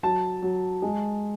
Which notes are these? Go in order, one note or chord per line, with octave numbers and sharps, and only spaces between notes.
F#3 A5
F#3
G#3